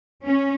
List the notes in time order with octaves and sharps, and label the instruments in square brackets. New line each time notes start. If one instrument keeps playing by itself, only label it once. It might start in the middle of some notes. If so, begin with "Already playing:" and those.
[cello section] C#4